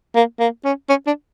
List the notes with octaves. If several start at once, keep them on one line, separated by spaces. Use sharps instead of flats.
A#3
A#3
C#4
C#4
D4